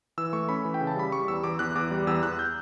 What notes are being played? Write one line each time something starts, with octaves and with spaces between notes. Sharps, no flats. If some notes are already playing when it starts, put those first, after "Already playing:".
E3 E6
A3 C#6
C#4 B5
E3
G5
C#3
A5
G3 B5
G3 C#6
E2 E6
E2 D6
E2 F#6
E2 D6
G3
E2 E6
E2 F#6
G6